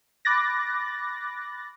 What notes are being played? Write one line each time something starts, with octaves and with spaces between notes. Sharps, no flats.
B5 D6 F#6 A6 A#6